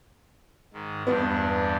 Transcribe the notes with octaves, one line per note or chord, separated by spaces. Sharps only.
G#2 D#3
E2 G2 B3 D4